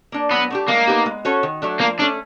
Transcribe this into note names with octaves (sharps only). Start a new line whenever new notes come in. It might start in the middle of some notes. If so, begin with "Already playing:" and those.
A#3 D4
F#3 B3
A3 D4 G4
G#3 A#3
B3 D#4 G4
G#3
C#4 F#4 A4 C#5
D#3
F#3 A3 D4
F3 A#3
A3 C#4 D4